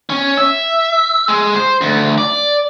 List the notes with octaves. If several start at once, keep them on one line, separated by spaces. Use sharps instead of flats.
C#4
E5
G#3
C5
D2
D5